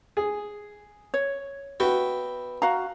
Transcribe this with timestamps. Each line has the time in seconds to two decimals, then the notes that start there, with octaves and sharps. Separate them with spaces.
0.17 G#4
1.14 C#5
1.80 B3 F#4 E5 G5
2.62 F#4 F5 A#5